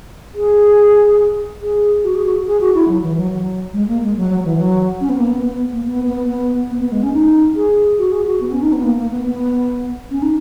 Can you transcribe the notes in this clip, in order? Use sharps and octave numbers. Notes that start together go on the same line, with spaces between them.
G#4
G#4
F#4
G#4
F#4
G#4
F#4
E4
F#3
E3
F#3
F#3
G#3
A#3
G#3
F#3
F#3
E3
F#3
C#4
B3
A#3
B3
B3
A#3
B3
B3
B3
B3
B3
G#3
C#4
D#4
G#4
F#4
G#4
F#4
B3
C#4
D#4
B3
A#3
A#3
B3
B3
C#4
D#4